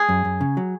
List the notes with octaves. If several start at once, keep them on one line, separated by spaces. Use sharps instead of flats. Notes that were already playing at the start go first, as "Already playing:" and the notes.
Already playing: G#3 G#4
F#2
F#2
C#3
F#3